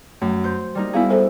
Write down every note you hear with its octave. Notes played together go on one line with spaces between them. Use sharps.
F#2 A3
C5 G6
G3 A#3 D#4
B3 E4 F#4 G#4 F5 A#5
A4 C5 E5